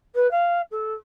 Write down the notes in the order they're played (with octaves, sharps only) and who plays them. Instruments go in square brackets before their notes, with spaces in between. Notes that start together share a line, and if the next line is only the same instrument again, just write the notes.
[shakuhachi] B4
F5
A4